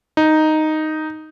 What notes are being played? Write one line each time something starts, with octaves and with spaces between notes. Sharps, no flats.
D#4